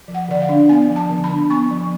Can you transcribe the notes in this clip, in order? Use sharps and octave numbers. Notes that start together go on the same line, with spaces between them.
F3
F#5
D3 D5
F5
D4
B3 G#5
F3
A5
D3
B5
D4
B3 C#6
F3